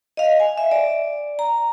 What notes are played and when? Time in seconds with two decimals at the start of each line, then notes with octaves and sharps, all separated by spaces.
0.17 D#5 F5
0.40 G#5
0.58 E5
0.72 D5
1.39 A#5